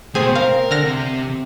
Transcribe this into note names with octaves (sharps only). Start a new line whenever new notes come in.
B2 A3 C4 G#4
A#4 F5
D3 F6 A#6
C3